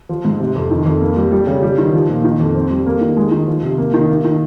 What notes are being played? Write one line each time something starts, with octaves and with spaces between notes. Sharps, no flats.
F3
G#2
C3
F2
D#3
F2
A#3
G3
G3
C#3
G3
D#3
F3
A#2
D#3
F2
C4
G3
A#3
D#3
G#3
D#3
F3
C3
A#3
D#3
A#3
D#3